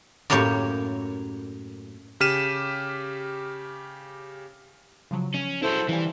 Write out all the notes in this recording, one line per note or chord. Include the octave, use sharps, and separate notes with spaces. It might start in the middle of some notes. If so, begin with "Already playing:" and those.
F#2 A2 A#3 G4 C#5
C#3 G4 F6 B6 D#7 E7
C#3 F3 F#3
C#4
E4 F#4 A4 C5
E3 G3 F5 G#5